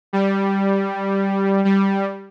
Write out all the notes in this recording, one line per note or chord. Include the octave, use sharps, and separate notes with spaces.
G3
G3